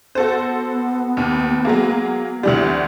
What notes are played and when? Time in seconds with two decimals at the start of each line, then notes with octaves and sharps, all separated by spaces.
0.15 B3 F#4 A4 C5
1.17 D#2
1.65 F#3 G#3 A#3
2.43 D2 E3 G3